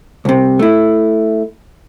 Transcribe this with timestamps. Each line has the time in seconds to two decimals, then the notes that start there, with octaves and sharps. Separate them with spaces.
0.25 C2 C3
0.59 A3 E4